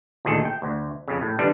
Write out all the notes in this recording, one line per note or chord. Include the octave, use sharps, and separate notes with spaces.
D2 A#2 D#3 G#4 A4
G5
D2
F2 C#3
A2
D3 E3 G3 D4